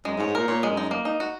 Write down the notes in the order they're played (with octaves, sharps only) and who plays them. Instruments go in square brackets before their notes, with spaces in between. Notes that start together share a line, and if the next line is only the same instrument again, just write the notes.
[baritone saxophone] F#2 [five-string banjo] G#3
[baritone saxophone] G#2
[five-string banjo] C#5
[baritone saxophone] G#2
[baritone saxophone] A#2 [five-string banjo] A#4
[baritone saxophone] A#2 [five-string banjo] C#5
[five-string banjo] G#3
[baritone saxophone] F#2
[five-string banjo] D#4
A#3
D#4
F#4